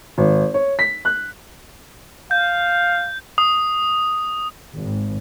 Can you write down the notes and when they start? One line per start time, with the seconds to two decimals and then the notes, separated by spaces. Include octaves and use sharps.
0.18 G#1
0.54 C#5
0.79 B6
1.05 F#6
2.31 F5 G6
3.38 D#6
4.75 G#1